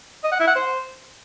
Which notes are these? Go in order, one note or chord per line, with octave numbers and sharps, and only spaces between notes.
D#5
F#5
E4
F#5
C5